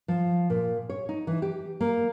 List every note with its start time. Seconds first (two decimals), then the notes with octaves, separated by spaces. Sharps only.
0.08 F3
0.50 A#2
0.90 C#5
1.09 D#4
1.27 E3
1.42 G4
1.81 A#3